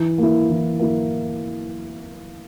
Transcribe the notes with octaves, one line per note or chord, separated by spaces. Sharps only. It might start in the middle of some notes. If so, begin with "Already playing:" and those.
Already playing: E3
A#3 E4
E3
A#3 E4